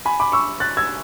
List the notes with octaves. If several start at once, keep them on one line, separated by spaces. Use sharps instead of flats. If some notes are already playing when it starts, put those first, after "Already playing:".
G#5 B5
B5 D6
C#6 E6
F#6 A6
E6 G#6